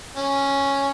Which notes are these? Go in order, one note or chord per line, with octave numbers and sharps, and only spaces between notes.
C#4